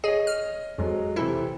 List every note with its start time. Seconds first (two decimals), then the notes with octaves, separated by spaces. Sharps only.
0.04 G#4 C#5 D#5
0.27 F6
0.78 F2 F#3 G#3
1.16 C3 E3 C4 E4 A4